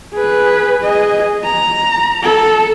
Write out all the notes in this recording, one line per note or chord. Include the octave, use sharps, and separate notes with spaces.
G#4 B4
G#4 D#5
A#5
A4